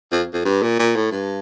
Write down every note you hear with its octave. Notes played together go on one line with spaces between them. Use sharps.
F2
F2
G2
A#2
A#2
A2
G2